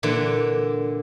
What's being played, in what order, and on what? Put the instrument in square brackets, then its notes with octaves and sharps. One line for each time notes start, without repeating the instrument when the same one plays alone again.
[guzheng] A#2 D3 E3